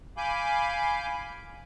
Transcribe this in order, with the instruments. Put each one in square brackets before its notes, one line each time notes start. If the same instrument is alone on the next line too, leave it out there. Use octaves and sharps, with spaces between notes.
[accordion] F5 G#5 B5 D6 G6